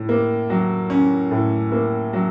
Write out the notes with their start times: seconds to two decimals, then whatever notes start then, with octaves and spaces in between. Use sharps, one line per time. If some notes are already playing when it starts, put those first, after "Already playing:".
Already playing: A2
0.09 A#3
0.50 F#3
0.90 C#4
1.31 A2
1.72 A#3
2.13 F#3